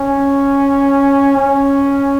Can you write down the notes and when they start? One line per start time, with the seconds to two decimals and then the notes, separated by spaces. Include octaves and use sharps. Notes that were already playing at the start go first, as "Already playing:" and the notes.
Already playing: C#4
1.37 C#4